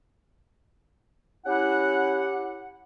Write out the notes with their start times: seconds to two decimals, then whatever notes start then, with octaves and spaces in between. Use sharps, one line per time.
1.45 C#4 E4 G4 F#5